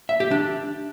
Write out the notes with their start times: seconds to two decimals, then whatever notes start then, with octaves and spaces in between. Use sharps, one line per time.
0.09 E5
0.20 G4
0.31 D4